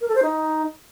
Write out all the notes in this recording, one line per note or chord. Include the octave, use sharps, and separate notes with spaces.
A#4
A4
C5
D#4